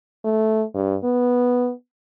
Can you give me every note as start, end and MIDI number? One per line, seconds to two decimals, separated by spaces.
0.25 0.64 57
0.75 0.96 43
1.04 1.72 59